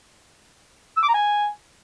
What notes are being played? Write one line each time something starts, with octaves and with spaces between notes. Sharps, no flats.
E6
D6
A#5
G#5